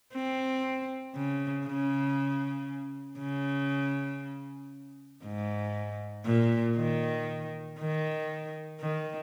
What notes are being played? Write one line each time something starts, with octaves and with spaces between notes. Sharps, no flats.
C4
C#3
C#3
C#3
G#2
A#2
D#3
D#3
D#3